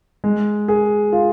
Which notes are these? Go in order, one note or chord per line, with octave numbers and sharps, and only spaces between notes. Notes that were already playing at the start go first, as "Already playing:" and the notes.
G#3
G#4
F4